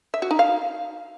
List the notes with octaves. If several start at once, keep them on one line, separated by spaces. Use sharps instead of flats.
E5
F#4
D#4
F5